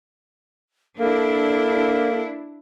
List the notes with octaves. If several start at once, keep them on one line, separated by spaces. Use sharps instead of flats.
A#3 D4 E4 A4